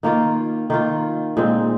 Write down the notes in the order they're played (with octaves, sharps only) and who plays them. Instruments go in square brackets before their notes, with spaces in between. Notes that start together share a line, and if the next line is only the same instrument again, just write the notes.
[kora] D#3 A#3 F4
D#3 A#3 F4
A#2 G#3 C4